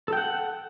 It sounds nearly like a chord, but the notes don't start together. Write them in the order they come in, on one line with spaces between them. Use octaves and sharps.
A4 G5 F#5